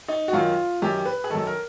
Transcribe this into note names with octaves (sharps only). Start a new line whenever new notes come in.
D#4
F#4
F#2 D#3 F4
F#2 D#3 G4
B4
G#4
F#2 D#3 A4
A#4